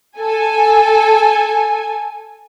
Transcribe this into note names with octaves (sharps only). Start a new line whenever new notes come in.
A4 G#5